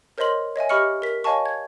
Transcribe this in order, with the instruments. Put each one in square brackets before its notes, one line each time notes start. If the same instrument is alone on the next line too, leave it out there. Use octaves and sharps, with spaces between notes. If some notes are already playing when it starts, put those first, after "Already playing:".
[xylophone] A#4 C5 C#5 D#5 C6 F#7
C#5 D#5 E5 G#5
G4 D#5 B5 C#6 F6 C#7
A#4 B6
C#5 D#5 F5 G#5 A5 C#6
G#6